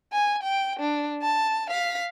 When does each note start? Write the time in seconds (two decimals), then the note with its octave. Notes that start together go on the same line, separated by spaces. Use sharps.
0.12 G#5
0.43 G5
0.80 D4
1.22 A5
1.70 F5 B6